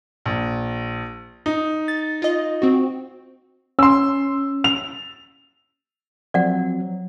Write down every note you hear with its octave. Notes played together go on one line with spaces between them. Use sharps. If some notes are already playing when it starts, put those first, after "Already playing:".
A#1
D#4
A6
F4 D#5
C4 F#4
C#4 C6 E6
F7
F3 F#3 C4 D5 F#5